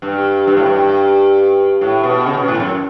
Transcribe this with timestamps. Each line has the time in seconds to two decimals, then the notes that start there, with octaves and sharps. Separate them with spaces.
0.02 G2
0.47 G2
0.57 A2
0.66 G2
1.81 A2
2.03 B2
2.26 C#3
2.37 B2
2.48 A2
2.60 F#2